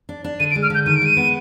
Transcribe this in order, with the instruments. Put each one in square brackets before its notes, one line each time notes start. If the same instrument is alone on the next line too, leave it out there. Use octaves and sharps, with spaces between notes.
[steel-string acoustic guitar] D4
D4
[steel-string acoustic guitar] D3 [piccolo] D#7
[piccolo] D7
[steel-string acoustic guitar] G#3
[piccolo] F6
[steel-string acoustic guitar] D3 [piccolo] G6
[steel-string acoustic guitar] D#3 [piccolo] D#7
[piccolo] D7
[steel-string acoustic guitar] G#3 [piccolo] D#7
[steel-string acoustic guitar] B3